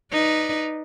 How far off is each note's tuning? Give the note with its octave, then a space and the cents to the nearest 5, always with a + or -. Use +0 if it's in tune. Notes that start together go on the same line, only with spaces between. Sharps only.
D#4 +0 B4 +0 D5 +10